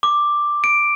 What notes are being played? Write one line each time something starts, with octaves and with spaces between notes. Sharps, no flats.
D6
D7